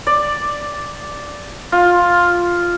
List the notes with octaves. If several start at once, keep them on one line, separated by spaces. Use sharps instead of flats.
D5
F4